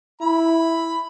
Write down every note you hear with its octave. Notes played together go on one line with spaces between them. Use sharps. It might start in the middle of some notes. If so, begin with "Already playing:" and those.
E4 B5